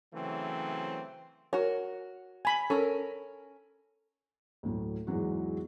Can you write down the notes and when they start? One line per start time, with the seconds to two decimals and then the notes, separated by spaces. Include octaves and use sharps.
0.14 C#3 E3 F#3 A3 C4
1.53 F#4 A#4 C#5
2.45 G#5 B5
2.70 C#4 A4 A#4
4.63 D2 A2 F#3
5.07 E2 G#2 E3 F#3 F#4